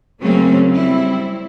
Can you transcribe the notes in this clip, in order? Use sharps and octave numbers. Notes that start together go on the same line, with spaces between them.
C#3 F#3 A3 A#3 C4 C#4
G3 C4 E4